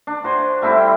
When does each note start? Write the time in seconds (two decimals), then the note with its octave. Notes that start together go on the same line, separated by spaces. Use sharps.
0.07 D4
0.24 F#4 C5 G#5
0.62 G3 A3 C4 E4